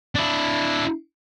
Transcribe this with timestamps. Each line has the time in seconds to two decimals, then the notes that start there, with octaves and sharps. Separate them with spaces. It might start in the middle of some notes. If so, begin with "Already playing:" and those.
0.15 D4 E4